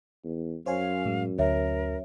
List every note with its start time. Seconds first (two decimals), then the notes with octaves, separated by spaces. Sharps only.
0.24 E2
0.66 F#2 C5 C#5 F5 G#5
1.05 A2 G#3
1.39 D2 A#4 C#5 E5